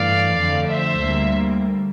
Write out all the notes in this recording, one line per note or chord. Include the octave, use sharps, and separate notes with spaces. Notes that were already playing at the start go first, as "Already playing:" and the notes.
Already playing: G2 E3 A3 D5 F5
F2 D3 A3
C5 E5
D2 D3 G3 A#3